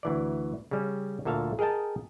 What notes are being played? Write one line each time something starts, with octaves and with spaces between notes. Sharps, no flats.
D2 E3 D5
C#3 G3 C#4
D2 A#2 A4 E5 F5
G#4 A#4 D#5 G5 A5